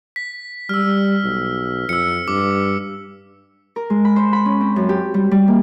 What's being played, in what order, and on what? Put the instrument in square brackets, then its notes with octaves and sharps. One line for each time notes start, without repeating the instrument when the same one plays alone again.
[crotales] B6
[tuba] G3 [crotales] E6 F6
[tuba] B1
[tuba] F2 [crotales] E6 C#7
[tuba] G2 [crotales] D6
[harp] A#4
G#3
B5
C5
B5
C#4
C4
F#2
G4
G3
G3
A#3